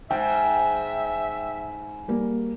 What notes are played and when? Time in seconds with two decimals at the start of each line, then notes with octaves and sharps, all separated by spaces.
0.11 G#2 E5 G5
2.08 G3 A#3